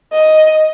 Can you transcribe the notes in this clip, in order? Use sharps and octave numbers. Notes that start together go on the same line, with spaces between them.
D#5